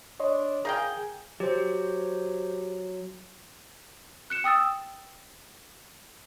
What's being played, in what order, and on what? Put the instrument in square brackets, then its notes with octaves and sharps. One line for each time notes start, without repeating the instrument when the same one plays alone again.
[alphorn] D4 [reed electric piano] C#5 D#5 C6
[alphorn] G#4 [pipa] A#4 F5 G5 [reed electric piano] D#6 G6 G#6
[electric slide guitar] F#3 [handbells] G4 C5
[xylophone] F#6 C#7 E7
G5 D#6 E6 A6